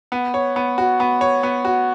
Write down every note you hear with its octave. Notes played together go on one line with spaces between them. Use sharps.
B3
C#5
B3
F#4
B3
C#5
B3
F#4